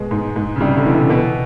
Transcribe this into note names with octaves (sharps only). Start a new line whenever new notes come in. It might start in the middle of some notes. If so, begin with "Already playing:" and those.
Already playing: B2 G#3
G#2
G#2
C#3
C3 G3
D3
B2 E3
C3
B2 B3